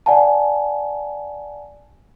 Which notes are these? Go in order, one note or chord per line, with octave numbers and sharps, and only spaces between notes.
D5 F#5 G#5 A5